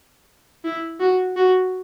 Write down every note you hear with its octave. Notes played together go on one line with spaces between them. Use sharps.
E4
F#4
F#4